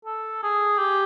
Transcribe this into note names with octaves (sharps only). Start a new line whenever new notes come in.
A4
G#4
G4